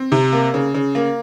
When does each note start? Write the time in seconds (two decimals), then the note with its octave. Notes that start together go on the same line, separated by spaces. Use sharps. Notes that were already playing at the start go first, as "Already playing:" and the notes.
Already playing: C4
0.12 C3
0.32 A#3
0.54 C#3
0.74 C#3
0.95 A#3